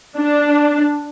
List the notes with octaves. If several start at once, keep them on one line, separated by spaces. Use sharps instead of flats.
D4